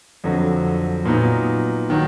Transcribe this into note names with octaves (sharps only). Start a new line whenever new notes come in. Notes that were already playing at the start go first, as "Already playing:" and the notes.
F2 D3 F#3
A#2 F#3 B3 D#4
D#3 F#3